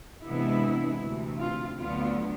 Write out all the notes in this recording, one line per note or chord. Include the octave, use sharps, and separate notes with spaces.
C3 E3 G#3 B3 D4 E4
D2 C3 E3
F4
D2 D3 F#3 B3 D4 F4